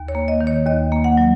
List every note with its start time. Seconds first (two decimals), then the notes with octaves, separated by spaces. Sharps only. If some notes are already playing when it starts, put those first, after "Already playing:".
Already playing: D#2
0.08 C#5
0.15 A#3
0.28 D#5
0.41 D#3
0.47 C#5
0.66 D#2 D#5
0.92 A#3
1.04 F#5
1.17 F#3